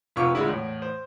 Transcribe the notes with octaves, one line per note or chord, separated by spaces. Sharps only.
F1 F2 B3 F4 C#6 D6
A#2 D3 G#3 E4
E2 A2
C5